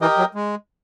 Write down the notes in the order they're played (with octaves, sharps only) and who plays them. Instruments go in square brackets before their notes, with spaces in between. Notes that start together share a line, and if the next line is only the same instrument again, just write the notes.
[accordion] E3 [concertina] G4 A#4 D#5 G5
[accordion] F#3
G#3